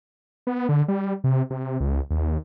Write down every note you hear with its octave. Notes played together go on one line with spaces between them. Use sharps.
B3
D3
G3
C3
C3
C#2
D#2